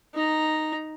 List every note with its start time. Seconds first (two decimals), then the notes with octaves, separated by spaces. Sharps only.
0.14 D#4 A#5